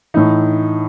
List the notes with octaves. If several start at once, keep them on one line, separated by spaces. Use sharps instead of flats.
A2 E3 D#4